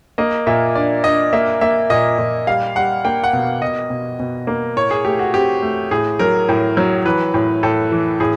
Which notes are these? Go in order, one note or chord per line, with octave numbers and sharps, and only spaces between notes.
A#3 D#5
A#2 E5
D4 D5
D4 D#5
A#3 E5
A#3 E5
A#2 D#5
A#2
G3 F5
G3 F#5
A#3 G5
F#5
B2
B2 D#5
B2
B2
A#3
A2 C#5
G#4
A3 G4
F#4
C4 G4
A3
A2 G#4
F#3 A#4
A2
F#3
E3 B4
A2
A2 A4
E3
A2 G#4